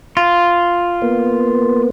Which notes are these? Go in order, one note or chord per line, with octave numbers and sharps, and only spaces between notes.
F4
A#3 B3